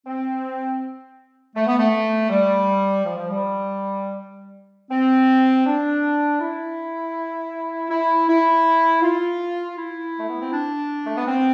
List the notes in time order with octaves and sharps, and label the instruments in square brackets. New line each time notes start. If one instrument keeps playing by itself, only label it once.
[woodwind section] C4
A3
B3
A3
G3
F3
F3
G3
C4
D4
E4
E4
E4
F4
E4
A3
B3
C4
D4
A3
B3
C4